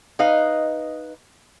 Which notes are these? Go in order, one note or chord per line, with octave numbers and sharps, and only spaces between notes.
D#4 B4 D#5 F5